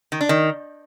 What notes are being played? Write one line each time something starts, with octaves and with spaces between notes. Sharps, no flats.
D#3
D4
D#3